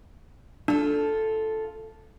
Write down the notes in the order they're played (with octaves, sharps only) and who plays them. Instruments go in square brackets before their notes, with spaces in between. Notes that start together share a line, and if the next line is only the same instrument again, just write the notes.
[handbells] D4 [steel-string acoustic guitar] F4 A4